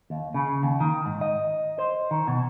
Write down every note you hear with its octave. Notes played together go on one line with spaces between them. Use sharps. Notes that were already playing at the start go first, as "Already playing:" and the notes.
D#2
C#3
D#2
D#3
G#2
D#5
C5
D#3
B2